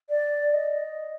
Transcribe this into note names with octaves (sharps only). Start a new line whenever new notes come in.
D5
D#5